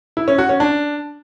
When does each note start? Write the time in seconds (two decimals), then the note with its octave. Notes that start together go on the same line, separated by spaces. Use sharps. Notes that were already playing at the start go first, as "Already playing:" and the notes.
0.17 E4
0.28 C#4
0.38 F#4
0.49 C#4
0.60 D4